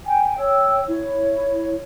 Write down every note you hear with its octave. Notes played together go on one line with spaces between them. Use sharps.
G5 G#5
C#5 G5 E6
E4 C#5